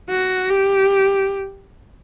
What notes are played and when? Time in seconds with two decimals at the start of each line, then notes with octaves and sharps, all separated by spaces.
0.09 F#4
0.50 G4